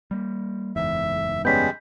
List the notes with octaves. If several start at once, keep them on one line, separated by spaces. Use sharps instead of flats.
G3 A#3
F#1 E2 G#2 E5
G3 G#3 B3 C#4 G6 B6